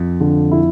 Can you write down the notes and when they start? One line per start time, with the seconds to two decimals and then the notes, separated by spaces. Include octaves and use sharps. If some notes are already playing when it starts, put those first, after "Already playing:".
Already playing: F2
0.20 D3
0.51 E4